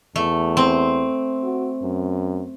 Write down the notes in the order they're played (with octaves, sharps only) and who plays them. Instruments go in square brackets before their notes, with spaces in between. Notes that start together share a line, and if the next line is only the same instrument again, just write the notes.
[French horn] E2 [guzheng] A3
[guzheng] C4
[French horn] F#4
F#2